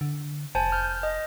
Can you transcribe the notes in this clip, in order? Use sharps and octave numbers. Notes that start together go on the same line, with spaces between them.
D3
F1 C5 G#5 A5
F6 G6
D#5